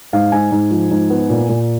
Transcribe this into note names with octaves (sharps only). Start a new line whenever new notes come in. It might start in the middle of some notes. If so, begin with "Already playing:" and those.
G#2 F5
G#2 G#5
G#2
F3
G#2
B3
A#2
A#2